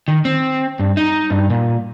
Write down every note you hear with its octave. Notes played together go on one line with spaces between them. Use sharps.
D#3
C4
G2
D#4
G2
A#2